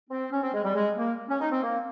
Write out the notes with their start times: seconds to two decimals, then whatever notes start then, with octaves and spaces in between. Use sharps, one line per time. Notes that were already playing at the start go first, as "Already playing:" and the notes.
0.09 C4
0.32 C#4
0.42 C4
0.53 G#3
0.63 G3
0.74 G#3
0.96 A#3
1.29 C#4
1.39 D#4
1.51 C4
1.62 A#3